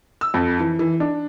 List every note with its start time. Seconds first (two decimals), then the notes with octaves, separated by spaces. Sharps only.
0.21 E6
0.34 F2
0.59 E3
0.79 E3
1.00 D4